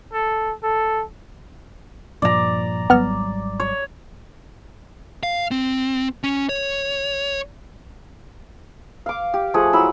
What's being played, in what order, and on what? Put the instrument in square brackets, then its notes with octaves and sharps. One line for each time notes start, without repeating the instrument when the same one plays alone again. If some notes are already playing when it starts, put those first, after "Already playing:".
[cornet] A4
A4
[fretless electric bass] G2 A#2 F3 [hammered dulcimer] D5 A#5
[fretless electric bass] G#1 F#3 G3 [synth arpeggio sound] B3 F6
[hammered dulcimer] C#5
[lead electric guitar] F5
C4
C#4
C#5
[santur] F5 D6
G4
F3 A3 G#4 F#5
F#3 E4 B5 E6